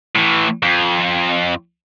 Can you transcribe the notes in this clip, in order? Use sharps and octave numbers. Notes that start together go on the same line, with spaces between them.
A2 E3
F2